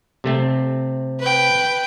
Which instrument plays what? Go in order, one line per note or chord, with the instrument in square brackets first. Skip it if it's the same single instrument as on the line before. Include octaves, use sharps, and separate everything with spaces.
[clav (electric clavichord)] C3 A3 C4
[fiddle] B4 G5